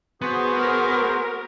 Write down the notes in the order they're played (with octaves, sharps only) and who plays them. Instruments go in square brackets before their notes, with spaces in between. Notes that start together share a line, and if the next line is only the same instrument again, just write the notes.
[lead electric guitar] B3 [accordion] F#4 G#4 C5
[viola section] A#4